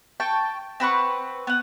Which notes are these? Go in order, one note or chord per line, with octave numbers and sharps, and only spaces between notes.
G5 A5 C#6
C4 B4 F#5 C#6
B3 F#5